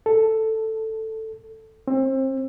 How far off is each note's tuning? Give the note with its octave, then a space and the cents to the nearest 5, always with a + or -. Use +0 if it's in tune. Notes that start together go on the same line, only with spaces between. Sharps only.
A4 +5
C4 +30